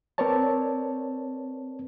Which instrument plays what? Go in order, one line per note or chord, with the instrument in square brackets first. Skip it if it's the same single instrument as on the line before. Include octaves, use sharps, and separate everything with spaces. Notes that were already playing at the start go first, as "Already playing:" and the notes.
[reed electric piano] C4 A#4 B4 C#5 D5 A5